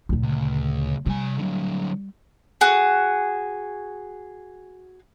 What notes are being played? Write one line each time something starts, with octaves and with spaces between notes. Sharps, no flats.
D2 A#2
C#2
C3 G3 G#5
D3 F#3
F#4 G#4